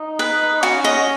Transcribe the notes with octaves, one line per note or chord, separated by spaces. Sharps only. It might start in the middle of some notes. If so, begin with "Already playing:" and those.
Already playing: D#4
B4
C#4 F#4
D#5